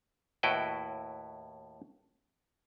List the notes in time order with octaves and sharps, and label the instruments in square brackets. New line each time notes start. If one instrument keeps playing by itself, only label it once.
[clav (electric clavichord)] D#2 A2 E4 F#4 B4 G5